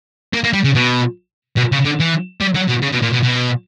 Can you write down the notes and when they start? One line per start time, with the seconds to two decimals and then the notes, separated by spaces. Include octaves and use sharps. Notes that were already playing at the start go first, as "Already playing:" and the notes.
0.34 A#3
0.44 A#3
0.53 G3
0.64 C#3
0.75 B2
1.57 B2
1.72 C#3
1.85 D3
2.00 E3
2.41 G3
2.55 F#3
2.69 B2
2.82 C#3
2.93 B2
3.03 A#2
3.13 B2
3.23 B2